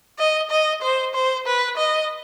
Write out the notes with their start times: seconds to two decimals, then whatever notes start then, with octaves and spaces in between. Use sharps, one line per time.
0.19 D#5
0.51 D#5
0.82 C5
1.15 C5
1.46 B4
1.77 D#5